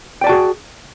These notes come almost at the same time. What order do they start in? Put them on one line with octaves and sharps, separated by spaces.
G5 D5 A5 F#4 G#4